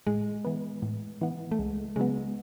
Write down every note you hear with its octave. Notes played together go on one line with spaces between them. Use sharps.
A2 G#3
E3 B3
A2
E3 B3
A3
C#2 G#3
C#3 F#3 G#3 B3